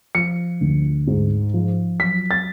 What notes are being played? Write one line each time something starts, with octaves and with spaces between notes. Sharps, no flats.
F3 C#7
D2
G#2
F3
F#3 B6
A6